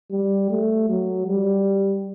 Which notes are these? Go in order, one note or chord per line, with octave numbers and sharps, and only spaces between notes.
G3
A3
F#3
G3